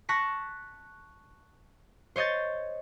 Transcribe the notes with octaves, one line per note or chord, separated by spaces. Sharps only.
A5 C#6 F#6 A#6 B6
C5 C#5 D#5 G6 A6